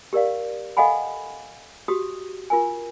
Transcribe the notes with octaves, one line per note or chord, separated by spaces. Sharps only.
G4 A#4 D5 F5
A4 D#5 F5 F#5 G#5 B5
F#4 G4 D#6
F4 A#4 G#5